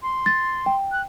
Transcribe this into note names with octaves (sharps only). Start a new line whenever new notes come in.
C6
A6
G5
F#6